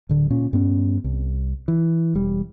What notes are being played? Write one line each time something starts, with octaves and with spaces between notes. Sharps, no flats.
D1 D3
A#2 C#4
G2 B3 C#4
C2
E3
E1 G3